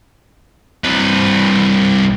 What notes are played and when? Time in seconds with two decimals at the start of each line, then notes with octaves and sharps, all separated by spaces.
0.84 C2 B4